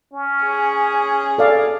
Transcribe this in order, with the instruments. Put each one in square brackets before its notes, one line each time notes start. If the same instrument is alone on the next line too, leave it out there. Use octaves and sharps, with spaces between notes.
[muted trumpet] C#4
[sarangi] G#4
[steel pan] A4 D5 F5